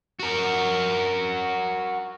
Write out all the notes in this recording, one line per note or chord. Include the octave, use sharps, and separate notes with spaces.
F#4 A#4